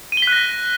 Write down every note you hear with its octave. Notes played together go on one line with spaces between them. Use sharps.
D#7
G7
B6
F#6
A#6